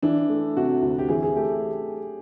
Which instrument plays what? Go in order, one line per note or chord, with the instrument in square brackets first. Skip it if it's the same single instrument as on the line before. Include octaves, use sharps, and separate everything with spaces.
[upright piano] E3 [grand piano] D4
[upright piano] A3
[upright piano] C3 [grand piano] F#4
[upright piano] D2
[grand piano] G4
[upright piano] E3 [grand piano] G#4
[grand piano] G#4
[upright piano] A3 [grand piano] G4